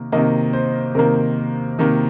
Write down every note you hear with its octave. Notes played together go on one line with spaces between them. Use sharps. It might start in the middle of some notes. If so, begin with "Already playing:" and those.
Already playing: C3 D#3 A#3
C3 D#3 A#3 D#5
C5
C3 D#3 A#3 A#4
C3 D#3 A#3